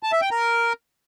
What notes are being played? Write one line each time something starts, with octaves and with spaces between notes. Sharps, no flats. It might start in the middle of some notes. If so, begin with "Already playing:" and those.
A5
E5
G5
A#4